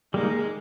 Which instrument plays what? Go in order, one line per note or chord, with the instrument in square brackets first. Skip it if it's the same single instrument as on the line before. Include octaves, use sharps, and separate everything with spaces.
[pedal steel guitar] G3 A#3 D#4 [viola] G#3